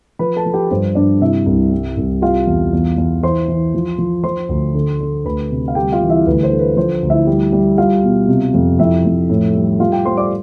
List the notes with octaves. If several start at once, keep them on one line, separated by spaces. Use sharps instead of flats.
F3 B4 B5
A4 A5
F3
G4 G5
G2 C5
G2 D4 D5
C3 E4 E5
C2
G3
C2
G3 F4 F5
E2
E2
E2
E3 C5 C6
E3
F3
F3
F3 C5 C6
D2
D3
D3
D2 B4 B5
C3
F5
G3 G4 G5
F4 F5
E3
E4 E5
D2 B4
C5
D3
B4
F3 C5
D2
E4 E5
G3
G3
G3 F4 F5
B2
C3
F2
F2 E4 E5
F2
A2
G3
G3 F4 F5
G4 G5
G3 C5 C6
D5 D6